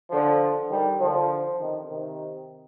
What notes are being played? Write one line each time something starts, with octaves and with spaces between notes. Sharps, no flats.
D3 F3
D#3 G3
D3 F3
C3 D#3
C3 D#3